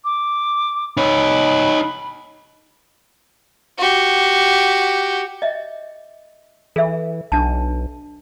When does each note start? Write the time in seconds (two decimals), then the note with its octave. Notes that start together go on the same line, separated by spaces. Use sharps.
0.05 D6
0.97 D#4 C#5 B5
3.78 F#4 G4
5.42 D#5 E5
6.76 E3 A4 E5
7.32 B1 D4 A5